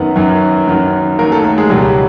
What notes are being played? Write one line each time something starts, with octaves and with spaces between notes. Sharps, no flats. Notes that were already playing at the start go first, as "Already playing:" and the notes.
Already playing: F#2 D#3 F#3 B3 B4
F#2 D#3 F#3
F#2 D#3 F#3
F#2 D#3 F#3 A#3 A#4
A3 A4
A3 A4
G#3 G#4
C#2 B2 F#3 G3 G4